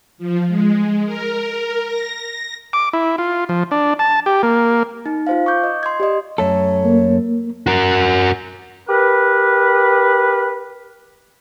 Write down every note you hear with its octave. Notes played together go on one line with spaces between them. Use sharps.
F3
G#3
A#4
A#6
D6
E4
F4
F3
D4
A5
G4
A#3
D#4
F4 C5 F5
C#6 D6 G6
D#5
C6 G#6
G4 D5 D#5
F#2 A3 A4 C#5
A#3
F#4 A#4
G4 A#4 B4